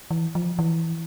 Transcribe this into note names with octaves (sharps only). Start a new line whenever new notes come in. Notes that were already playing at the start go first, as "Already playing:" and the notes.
E3
F3
E3